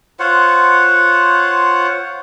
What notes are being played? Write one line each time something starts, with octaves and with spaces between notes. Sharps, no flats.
F4 C5 C#5 F#5